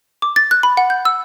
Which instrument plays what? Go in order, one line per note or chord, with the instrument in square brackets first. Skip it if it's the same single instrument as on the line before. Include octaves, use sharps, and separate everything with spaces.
[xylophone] D6
A6
F#6
B5
F#5
G6
E6